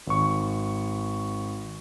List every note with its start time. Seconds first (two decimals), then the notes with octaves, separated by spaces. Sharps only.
0.07 G#1 C#6